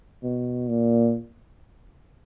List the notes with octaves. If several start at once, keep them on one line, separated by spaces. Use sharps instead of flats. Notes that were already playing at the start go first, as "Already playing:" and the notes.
B2
A#2